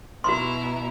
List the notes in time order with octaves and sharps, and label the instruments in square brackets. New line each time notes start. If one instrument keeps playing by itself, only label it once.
[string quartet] B2 E4 A#5 [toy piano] F#4 C6